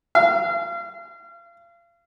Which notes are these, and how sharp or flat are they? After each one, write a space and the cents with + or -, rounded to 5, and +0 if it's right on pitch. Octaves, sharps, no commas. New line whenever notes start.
F5 -35